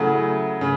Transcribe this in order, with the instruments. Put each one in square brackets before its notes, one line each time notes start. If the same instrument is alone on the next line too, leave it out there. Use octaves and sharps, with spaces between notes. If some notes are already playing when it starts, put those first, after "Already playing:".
Already playing: [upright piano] C#3 F#3 A3 E4
C#3